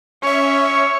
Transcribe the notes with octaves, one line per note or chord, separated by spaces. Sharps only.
C#4 C#5 E5